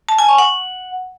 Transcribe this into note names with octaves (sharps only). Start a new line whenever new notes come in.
A5
G#5
C#6
F#5